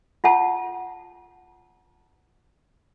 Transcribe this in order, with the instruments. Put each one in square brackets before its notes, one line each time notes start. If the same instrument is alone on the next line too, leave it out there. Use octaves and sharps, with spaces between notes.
[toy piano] F4 F#5 A5